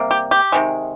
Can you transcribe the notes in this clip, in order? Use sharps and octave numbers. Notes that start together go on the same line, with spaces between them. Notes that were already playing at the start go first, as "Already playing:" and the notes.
Already playing: C3 G3 A#3
G4
G4
C3 D#3 G#3